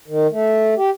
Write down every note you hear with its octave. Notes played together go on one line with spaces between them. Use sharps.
D#3
A3
G4